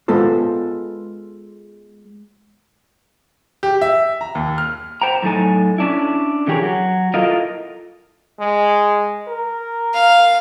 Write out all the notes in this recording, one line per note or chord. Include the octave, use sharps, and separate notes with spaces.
G#3 B3 F4 A4 C5
G4
E5
A#5
D#2
F6
C5 G5 A#5
A2 F#3 D#4 A4 G#5
C#4 D4 E4
D3 E3 G4 G#4 A#4 C#5
F#3
E4 F4 A4 A#4 D#5 F5
G#3
A#4
F5